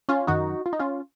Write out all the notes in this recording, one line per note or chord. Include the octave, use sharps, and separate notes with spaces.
C#4 F4
F#2 D#3 D#4 F#4
F4
D#4
C#4 F4